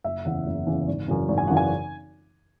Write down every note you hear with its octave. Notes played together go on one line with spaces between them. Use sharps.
F#1 E5
E2 C#3 E3 F#5
F#1
E2 C#3 E3
G#1
F#2 C#3 E3
G#1
G#5
F#2 C#3 E3 F#5
G#5